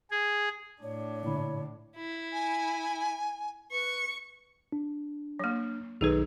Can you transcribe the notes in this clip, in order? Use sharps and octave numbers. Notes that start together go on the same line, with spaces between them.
G#4
A2 D4 C#5
A#2 D3 E4
E4
G#5
B4 C#6
D4
F#3 A#3
B1 D#3 D#4 G#4 A4 B4